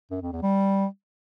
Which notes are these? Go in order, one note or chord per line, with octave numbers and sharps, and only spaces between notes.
F#2
F2
E2
G3